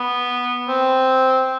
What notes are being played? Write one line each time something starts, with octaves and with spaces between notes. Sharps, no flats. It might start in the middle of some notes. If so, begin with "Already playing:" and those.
Already playing: B3
C4